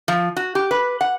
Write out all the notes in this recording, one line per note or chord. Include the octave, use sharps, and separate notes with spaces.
F3
F#4
G4
B4
F#5